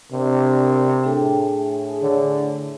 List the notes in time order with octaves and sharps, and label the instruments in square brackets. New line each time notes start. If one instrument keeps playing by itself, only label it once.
[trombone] C3 [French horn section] D4 A#4 D5
[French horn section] A2 G#4 [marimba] D4 A4 G5
[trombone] D3 [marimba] C#5